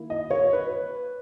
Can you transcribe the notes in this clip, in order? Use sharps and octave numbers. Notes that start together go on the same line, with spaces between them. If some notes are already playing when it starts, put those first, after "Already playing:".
Already playing: D#3 A#3 E4
D#5
C#5
B4